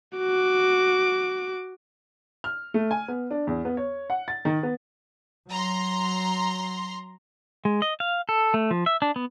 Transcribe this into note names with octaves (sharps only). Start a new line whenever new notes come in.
F#4 D6
F6
A3
G#5
B3
D4
E2
B3
C#5
F#5
A6
D#3
B3
F#3 A#5 C6
G#3
D#5
F5
A4
A3
F3
E5
D4
B3